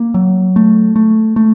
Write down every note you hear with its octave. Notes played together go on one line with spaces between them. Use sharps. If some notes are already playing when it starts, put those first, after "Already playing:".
Already playing: A#3
F#3
A3
A3
A3